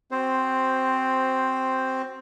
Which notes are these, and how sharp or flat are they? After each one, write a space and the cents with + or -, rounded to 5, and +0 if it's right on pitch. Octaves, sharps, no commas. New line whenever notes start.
C4 +0 F#4 +20 C5 +5